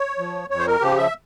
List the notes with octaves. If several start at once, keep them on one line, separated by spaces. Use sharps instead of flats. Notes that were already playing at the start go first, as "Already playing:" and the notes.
Already playing: C#5
F3
F2 C#5
C5
A#4
C#3 F3 G4
E5